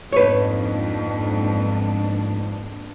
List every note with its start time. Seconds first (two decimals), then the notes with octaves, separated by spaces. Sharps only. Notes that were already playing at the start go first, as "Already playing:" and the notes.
0.13 F2 G#2 A#3 B3 D4 B4 C#5